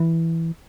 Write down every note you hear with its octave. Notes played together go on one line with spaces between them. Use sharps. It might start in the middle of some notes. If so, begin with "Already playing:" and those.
Already playing: E3